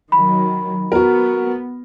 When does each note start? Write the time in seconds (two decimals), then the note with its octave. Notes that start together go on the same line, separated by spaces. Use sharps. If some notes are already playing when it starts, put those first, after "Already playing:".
0.12 D#3 F#3 B5
0.92 B3 F#4 A#4